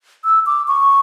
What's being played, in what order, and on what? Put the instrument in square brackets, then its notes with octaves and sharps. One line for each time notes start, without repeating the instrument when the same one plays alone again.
[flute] E6
D6
C#6